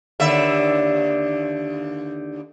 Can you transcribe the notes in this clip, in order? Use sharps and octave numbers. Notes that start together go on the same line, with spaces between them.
D#2 D3 E5